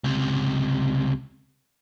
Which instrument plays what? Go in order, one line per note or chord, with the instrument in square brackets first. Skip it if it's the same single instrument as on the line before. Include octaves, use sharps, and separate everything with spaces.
[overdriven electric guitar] C#2 C3